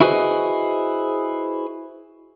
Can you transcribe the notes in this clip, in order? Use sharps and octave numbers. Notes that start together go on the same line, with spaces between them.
E4 F#4 G#4 B4 C5 D#5